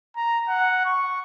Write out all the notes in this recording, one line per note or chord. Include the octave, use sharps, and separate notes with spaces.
A#5
F#5
C#6